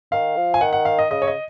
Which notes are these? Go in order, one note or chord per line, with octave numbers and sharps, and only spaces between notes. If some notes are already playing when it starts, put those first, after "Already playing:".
D#3 F5
F3
G#5
D#3 F#5
F#5
F5
D#5
C#3 D#5
C#5
D#5